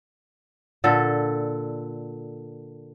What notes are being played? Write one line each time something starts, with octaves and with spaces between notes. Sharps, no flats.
A#2 D3 A4